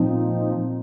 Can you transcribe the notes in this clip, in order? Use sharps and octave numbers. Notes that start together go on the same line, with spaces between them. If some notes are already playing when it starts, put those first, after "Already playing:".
Already playing: A#2 F3 C4 D#4